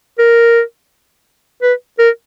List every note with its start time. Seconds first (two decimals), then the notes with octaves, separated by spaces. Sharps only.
0.18 A#4
1.62 B4
1.98 A#4